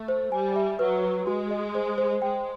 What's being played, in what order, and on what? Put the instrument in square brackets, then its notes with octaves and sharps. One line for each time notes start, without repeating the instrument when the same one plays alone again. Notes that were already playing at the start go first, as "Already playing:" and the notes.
Already playing: [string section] A3
[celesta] C5
[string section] G3 [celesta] G#5
[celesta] E5
[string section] F#3 [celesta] B4
[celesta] B4
[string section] G#3 [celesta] F#4
[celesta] D#5
C5
C5
[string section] G#3 [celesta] G5